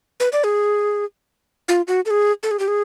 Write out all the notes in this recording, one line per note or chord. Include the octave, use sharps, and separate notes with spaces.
B4
D5
G#4
F4
F#4
A4
G#4
A4
G#4
G4
G#4